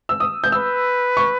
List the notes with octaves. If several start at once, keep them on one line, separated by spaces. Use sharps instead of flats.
E6
D#6
G6
B4 E6
C#6